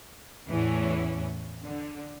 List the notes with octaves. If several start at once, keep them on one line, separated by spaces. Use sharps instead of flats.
E2 A2 E3 C#4
D3